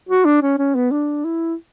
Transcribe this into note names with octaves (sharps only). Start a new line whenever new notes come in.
F#4
D4
C#4
C#4
B3
D4
E4